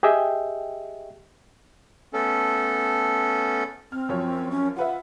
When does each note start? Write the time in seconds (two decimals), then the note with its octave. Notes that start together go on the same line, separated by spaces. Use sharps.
0.03 G4 G#4 D#5 E5 G5
2.13 A3 B3 C#4 A4
3.92 C4 F6
4.09 F#2 F3 C#5
4.51 C#4
4.76 F4 B4 E5 F#5